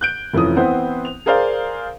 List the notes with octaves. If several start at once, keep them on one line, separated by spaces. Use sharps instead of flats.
F#6 G6 D7
F1 E3 F3 C#4 D#6
E3 B3 C4 E4 C5
F7
G#4 A#4 C5 D5 F5